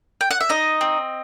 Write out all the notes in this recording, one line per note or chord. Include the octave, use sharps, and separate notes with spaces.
G5
F#5
E5
D#4 D#5
C4